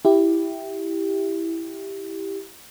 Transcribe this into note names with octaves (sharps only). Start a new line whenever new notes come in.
E4 G4